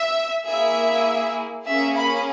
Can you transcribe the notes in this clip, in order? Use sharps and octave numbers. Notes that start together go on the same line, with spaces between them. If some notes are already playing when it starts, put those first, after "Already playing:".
Already playing: E5
A#3 E4 G#4 E5
A#3 C#4 G#4 E5
B5